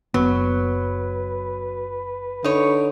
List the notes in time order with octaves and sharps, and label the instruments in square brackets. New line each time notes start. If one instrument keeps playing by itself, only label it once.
[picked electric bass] F#1 B3 [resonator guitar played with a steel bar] F#3 [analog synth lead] B4
[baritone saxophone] D3 [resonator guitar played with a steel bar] D#4 C#5